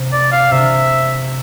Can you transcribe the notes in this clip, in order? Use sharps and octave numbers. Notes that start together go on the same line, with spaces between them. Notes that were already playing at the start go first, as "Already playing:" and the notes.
Already playing: C3
D5
F5
C3 E5